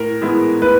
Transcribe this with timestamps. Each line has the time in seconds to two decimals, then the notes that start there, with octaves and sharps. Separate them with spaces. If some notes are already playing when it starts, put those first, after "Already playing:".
Already playing: A2 A#4
0.21 E3 G#3 B3 E4
0.62 A2 B4